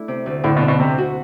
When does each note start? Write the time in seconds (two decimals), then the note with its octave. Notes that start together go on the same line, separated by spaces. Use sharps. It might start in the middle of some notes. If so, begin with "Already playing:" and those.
Already playing: A3 D4 E4
0.08 C3
0.26 D2
0.44 A2 D3
0.57 B2
0.63 C4
0.68 B2
0.80 C3 C4
0.98 F#4